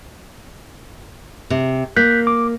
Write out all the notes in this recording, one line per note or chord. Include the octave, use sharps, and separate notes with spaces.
C3
A#3 F#6 G6 B6
D6